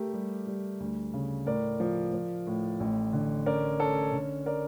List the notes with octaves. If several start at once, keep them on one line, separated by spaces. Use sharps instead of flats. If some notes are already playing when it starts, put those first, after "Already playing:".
Already playing: A3 G4 A#4
G3
G3
D2
C#3
A2 A#4 D5
F3
F3
A2
A1
D3
C#4 A#4 D5
C#4 A4 C#5
D3
A#4 D5